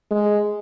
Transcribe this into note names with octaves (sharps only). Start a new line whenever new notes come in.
G#3